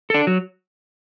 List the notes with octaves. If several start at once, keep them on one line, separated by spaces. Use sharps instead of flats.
D4 A4
F#3